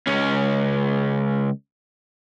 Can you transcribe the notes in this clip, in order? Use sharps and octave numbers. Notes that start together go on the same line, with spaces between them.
C#2 C#4